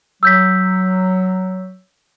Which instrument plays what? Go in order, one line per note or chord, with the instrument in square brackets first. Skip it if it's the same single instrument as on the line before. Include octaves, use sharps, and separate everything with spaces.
[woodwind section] F#3 [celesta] E6 G6 B6